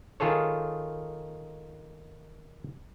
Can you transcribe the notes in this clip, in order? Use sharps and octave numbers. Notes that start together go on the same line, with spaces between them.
D#3 F4 G#4 A4 C#5